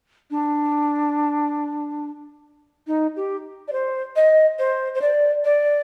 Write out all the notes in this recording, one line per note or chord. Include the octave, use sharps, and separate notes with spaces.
D4
D#4
G4
D5
C5
D#5
C5
C5
D5
D5